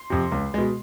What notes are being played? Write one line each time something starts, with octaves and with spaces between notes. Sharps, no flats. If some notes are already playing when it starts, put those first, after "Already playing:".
Already playing: C6
F2 C3
C#2
B2 G#3